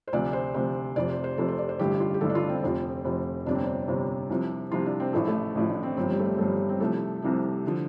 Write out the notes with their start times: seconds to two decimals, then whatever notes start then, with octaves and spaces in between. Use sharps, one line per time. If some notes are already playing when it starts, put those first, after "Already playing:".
0.08 C5
0.13 D2 C3 F3 D5
0.33 C5
0.54 D2 C3 F3 C5
0.96 F1 F2 C3 F3 D5
1.09 C5
1.24 C5
1.38 F1 F2 C3 F3 A4
1.48 C5
1.59 D5
1.69 C5
1.79 A1 G2 D3 G4
2.00 F4
2.14 G4
2.21 A1 G2 D3 A4
2.30 D4
2.35 F4
2.49 C4
2.63 F1 F2 F3
3.04 F1 F2 F3
3.46 G1 F2 C3 D4
3.55 C4
3.64 D4
3.88 G1 F2 C3
4.30 C2 C3 F3
4.72 C2 C3 F3 F4
4.86 D4
5.00 C4
5.13 A1 A2 F3 A3
5.28 A3
5.55 A1 A2 F3
5.69 D4
5.83 C4
5.97 G1 G2 F3 C4
6.11 G3
6.19 A3
6.25 G3
6.34 C4
6.38 G1 G2 F3 A3
6.69 C4
6.80 C2 C3 F3 A3
7.22 C2 C3 F3
7.66 D3 F3